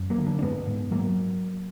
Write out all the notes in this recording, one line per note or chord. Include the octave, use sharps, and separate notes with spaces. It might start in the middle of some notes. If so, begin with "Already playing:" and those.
Already playing: F#2
F#3 A#3
D3
A#3 D4
D4
G#2 G#3 B3
G#2
G#2 F#3 A#3